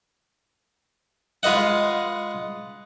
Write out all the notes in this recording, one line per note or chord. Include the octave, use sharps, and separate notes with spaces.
G#3 F4 B4 D#5 F#5